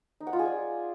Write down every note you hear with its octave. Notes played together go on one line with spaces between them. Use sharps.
D#4
F#5
F4
G#4
D5